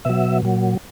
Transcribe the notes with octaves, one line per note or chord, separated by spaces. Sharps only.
B2 F#3 E5
A#2 F#3